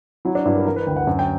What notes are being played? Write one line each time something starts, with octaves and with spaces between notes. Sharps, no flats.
F#3 E4
D4
G2 E4
A#4
E3 A#4
B4
D2 G5
F#5
F#2
G5